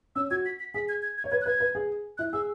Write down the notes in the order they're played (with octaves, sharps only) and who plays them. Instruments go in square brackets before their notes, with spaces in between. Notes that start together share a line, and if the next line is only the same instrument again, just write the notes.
[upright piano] C#4 [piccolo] E6
[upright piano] F#4 [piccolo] G#6
[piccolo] B6
B6
[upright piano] G#4 [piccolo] B6
[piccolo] G#6
G#6
G#6
[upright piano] C#5
[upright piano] B4 [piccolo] G#6
[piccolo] F#6
[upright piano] B4 [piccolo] G#6
[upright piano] B4
G#4
[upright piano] E4 [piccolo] F#6
[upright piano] G#4 [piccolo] E6